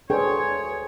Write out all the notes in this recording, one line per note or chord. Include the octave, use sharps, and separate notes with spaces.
D2 D4 G#4 A4 B4 C#5 G5 C6